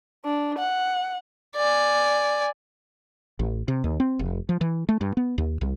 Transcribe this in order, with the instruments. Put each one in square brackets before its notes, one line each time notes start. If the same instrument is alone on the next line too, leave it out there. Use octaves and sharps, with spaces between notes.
[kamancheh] D4
F#5
[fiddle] D5 G#5
[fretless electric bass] A1
C3
D#2
C4
F1
F3
E3
A3
G2
B3
D#2
C2